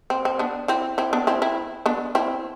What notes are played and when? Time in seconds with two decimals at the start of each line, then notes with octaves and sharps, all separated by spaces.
0.10 C4
0.25 C4
0.39 B3 D4
0.68 C4 E4
0.98 C4 E4
1.13 B3 D4
1.27 C4 E4
1.42 C4 E4
1.86 B3 D4
2.15 C4 E4